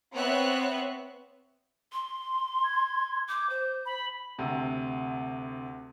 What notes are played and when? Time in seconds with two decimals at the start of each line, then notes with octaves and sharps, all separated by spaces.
0.14 B3 C4 B4 C#5 E5 F#6
1.93 C6
2.64 G#6
3.29 D6 G6
3.50 C5
3.86 B5
4.39 D2 C3